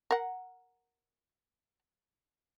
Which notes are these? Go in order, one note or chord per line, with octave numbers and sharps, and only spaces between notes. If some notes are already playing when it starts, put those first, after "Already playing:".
A#4 F#5